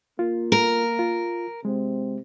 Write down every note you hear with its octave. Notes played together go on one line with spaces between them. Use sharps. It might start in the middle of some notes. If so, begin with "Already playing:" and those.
A#3 F4
A#4
F4
C3 G#3 C4